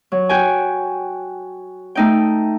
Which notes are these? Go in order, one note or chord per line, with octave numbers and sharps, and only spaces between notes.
F#3
F#4 G5 G#5
A3 D#4 G5